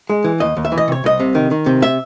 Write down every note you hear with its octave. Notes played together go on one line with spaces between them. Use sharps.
G#3
E3
D#2 D#5
D#2
E5
E3
D#5
C3 C#5
C2 D#5
C3
D#3
D#3
C3
E5